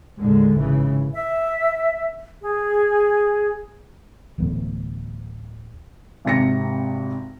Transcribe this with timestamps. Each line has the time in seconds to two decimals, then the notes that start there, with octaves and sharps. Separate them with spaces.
0.19 D#2 A2 D3 G#3
0.57 G#1 C#3 E3
1.14 E5
2.42 G#4
4.38 D1 E3 A3 B3
6.25 G#1 C3 A#6 C#7